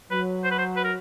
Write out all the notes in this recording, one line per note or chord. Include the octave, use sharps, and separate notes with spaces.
F#3 B4
C5
B4
C5
B4
A#4